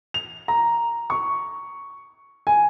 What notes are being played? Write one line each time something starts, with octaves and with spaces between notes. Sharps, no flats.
F7
A#5
C#6
G#5